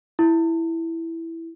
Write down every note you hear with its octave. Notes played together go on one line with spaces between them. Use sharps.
E4